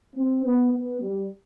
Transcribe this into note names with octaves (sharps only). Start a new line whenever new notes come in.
C4
B3
B3
G3